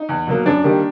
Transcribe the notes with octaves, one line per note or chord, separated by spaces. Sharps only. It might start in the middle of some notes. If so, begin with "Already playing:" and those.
Already playing: D#4
E2
B2 F#3 A#3
F#2 D4
D#3 G3 A#3